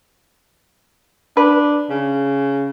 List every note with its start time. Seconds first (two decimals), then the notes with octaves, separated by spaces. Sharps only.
1.37 D4 B4
1.90 C#3